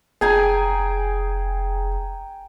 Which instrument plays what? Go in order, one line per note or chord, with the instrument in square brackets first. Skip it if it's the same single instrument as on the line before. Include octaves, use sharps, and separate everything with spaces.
[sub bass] F1 [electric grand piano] G#4 [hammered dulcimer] G5 G#5 A#5